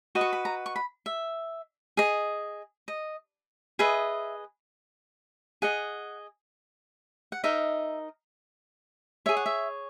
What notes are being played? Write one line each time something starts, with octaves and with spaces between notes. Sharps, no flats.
F#4 B4 D#5
C#6
B5
A#5
C#6
B5
E5
G#4 D#5
D#5
G#4 B4 D#5 E5
G#4 D#5 F#5
F#5
D#4 A#4 D#5 E5
G#4 C#5 E5
F#5
E5